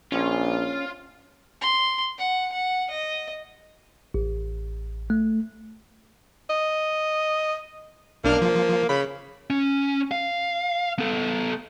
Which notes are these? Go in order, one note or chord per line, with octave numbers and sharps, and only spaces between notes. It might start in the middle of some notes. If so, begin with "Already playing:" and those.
A#1 C#4 F4
C6
F#5
F#5
D#5
A1
A3
D#5
B1 A#3 D4 F6
F3
C#3 B5
C#4
F5
B3 A4